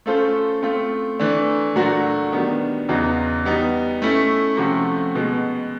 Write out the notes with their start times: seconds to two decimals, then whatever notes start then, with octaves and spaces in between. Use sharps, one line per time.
0.06 A3 C#4 F4 A4 C5
0.63 A3 C4 F4
1.20 E3 A3 D4
1.76 A#2 F#3 A3 D4 F#4
2.32 D#3 G3 B3 D4
2.89 E2 C#3 F#3 B3 D#4
3.45 G3 B3 D#4
4.02 A3 C#4 E4
4.57 C3 F3 A3 C#4 F#4
5.14 B2 G#3 B3